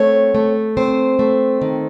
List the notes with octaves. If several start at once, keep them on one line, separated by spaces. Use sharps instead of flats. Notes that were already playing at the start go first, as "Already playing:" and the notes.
Already playing: A3 C4 C#5
A3
C4 C5
A3
D#3